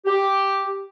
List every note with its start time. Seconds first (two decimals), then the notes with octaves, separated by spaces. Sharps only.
0.06 G4